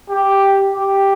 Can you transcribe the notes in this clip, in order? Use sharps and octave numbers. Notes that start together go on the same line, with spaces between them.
G4
G4